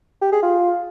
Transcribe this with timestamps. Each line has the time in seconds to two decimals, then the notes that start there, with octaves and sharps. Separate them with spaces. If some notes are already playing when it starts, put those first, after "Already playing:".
0.22 G4
0.32 G#4
0.43 F4